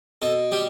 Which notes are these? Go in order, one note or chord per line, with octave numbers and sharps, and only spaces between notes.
B2 A4
G3 G4